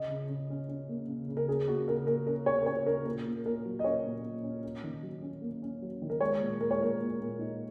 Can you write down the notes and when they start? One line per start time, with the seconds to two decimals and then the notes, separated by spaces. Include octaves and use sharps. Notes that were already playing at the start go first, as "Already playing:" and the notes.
Already playing: C#3 D#5
0.10 C#3
0.29 C#3
0.50 C#4
0.69 C#4
0.89 A#3
1.08 C#3
1.29 C#3
1.37 A#4
1.48 C#4 G#4
1.68 A#3 F#4
1.88 C#3 A#4
2.07 A#3 A#4
2.27 C#4 A#4
2.46 C#3 C#5
2.61 A#4
2.66 C#3 C#5
2.86 C#4 A#4
3.05 A#2 A#4
3.25 A#2
3.45 A#2 A#4
3.65 F#3
3.79 D#5
3.84 C#4 C#5
4.04 A#2
4.23 A#2
4.43 C#4
4.64 C#4
4.83 D#3
5.03 F#3
5.22 C#4
5.42 A#3
5.62 C#4
5.82 F#3
6.02 D#3
6.10 A#4
6.21 G#3 C#5
6.40 A#2
6.60 G#3 A#4
6.71 C#5
6.80 A#2 A#4
7.00 A#2
7.20 A#2
7.39 D#4